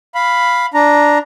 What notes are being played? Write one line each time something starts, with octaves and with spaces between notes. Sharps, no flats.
F5 B5
D4 A#5